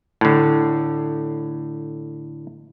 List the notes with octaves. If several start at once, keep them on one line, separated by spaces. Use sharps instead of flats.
A2 D3